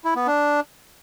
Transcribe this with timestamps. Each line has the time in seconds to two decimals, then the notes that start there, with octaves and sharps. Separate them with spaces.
0.04 E4
0.16 B3
0.27 D4